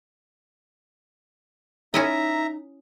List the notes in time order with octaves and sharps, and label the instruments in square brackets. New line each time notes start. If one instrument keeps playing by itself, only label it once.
[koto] C#4 E4 D#5 [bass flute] D#4 [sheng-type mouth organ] E5 A#5